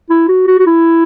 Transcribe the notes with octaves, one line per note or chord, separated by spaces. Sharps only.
E4
F#4
F#4
F#4
E4